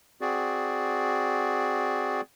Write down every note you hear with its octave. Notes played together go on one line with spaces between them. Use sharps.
C4 F#4 G#4 D5